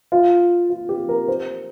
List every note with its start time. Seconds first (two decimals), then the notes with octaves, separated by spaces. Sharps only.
0.12 F4
0.70 F4
0.89 G4
1.09 A#4
1.28 C5